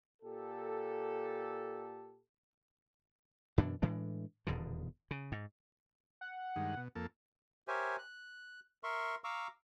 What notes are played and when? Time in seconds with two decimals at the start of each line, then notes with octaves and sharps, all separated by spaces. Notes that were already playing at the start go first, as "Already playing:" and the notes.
0.22 A#2 G4 A4
3.58 F#2 B2 E3 D4
3.82 A2 E3 G#3 D4
4.47 D#1 E2 B2 D3
5.11 C#3
5.32 G#2
6.21 F#5
6.56 G2 D#3 G#3
6.77 B2
6.95 F2 A#3 A4
7.68 G4 A#4 C5 C#5 E5 G#5
7.98 F#6
8.84 A#4 E5 C6 C#6
9.24 F5 A#5 C#6 D6 E6